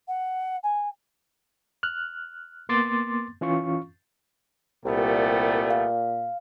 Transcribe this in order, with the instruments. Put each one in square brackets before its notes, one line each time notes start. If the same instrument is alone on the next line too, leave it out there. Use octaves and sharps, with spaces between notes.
[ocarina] F#5
G#5
[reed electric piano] F6 F#6
A#3 B3 C6 D6 A6
E3 C#4 F4 F5 C#6
[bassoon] C2 [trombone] A#2 [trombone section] G3 A3 B3
[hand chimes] F5